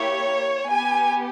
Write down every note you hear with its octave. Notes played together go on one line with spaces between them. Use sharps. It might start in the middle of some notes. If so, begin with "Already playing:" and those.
Already playing: A#3 E4 G4 C#5
B3 G4 G#5